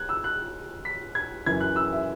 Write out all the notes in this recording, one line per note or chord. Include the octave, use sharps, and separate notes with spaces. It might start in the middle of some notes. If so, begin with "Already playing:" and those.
Already playing: F#6 G#6
E6
F#6
B6
G#6
F#2 E3 G#6
F#6
E6
E5